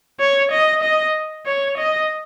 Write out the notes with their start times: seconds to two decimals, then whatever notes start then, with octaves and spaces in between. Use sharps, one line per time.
0.20 C#5
0.52 D#5
0.83 D#5
1.46 C#5
1.78 D#5